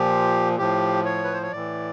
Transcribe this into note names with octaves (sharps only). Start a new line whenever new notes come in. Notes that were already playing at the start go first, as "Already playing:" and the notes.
Already playing: A#2 F3 G4
A2 F3 G4
C#5
B4
C5
C#5
A2 E3 D5